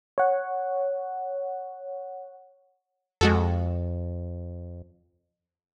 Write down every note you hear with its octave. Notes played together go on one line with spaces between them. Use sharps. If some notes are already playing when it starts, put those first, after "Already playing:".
C#5 F#5
F2 G#3 F#4 A4